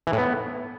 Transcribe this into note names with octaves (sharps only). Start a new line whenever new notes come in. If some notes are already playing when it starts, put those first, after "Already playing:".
E3
A2
B3